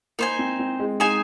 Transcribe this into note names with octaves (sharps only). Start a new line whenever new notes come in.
A#3 D#4 C5 G#5
C4
C4
G#3
G#3 D#4 C5 F5 G#5